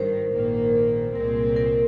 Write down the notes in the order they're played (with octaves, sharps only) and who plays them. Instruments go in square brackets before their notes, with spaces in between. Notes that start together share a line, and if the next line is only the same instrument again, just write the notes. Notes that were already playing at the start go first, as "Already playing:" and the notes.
Already playing: [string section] G#1 G2 D#3 [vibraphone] A#4 C5
[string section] A#1 G#2 D#3 A#3
[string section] C2 A#2 G#3 C4 [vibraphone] A#4
[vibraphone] A#4